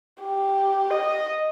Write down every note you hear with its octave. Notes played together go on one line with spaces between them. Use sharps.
G4
D#5